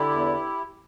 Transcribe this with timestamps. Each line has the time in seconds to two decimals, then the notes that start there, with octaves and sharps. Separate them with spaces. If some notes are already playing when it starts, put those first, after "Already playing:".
Already playing: D3 E4 G4
0.10 E2